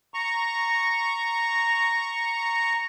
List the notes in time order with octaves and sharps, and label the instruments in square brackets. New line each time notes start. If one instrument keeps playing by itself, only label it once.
[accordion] A#5 C#6